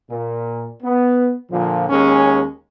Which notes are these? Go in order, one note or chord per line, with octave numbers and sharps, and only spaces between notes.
A#2
B3
A#2 D3 F3
D#2 G#3 C#4